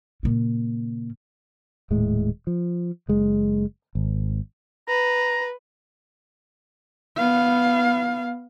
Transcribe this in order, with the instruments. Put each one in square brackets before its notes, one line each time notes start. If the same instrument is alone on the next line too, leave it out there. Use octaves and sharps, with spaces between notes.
[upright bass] A#2 C#3
[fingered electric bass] D#1 A2 G#3
F3
F#1 G#3
G#1
[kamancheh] B4 [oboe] A#5
[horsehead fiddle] B3 F5